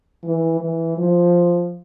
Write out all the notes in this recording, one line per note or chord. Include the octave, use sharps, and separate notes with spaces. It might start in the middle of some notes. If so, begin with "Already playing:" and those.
E3
E3
F3